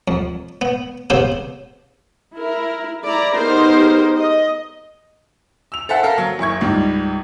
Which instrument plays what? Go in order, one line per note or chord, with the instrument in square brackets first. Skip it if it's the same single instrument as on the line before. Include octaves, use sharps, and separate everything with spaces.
[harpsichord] F2
B3
C#3 B3 C4 G4 C5
[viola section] E4 A#4
E4 D5 A#5
B3 D#4 G4 G#4 A#4 C5
D#5
[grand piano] E6 F7
A4 C5 E5 F#5 A5
A4 A#4 F5
F#3
F#1 E4 C#6 G#6
C#2 G#2 G3